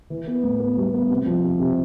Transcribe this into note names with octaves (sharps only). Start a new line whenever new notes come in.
E3
B3
A2
B3
G3
B3
C3
F3
C3
C3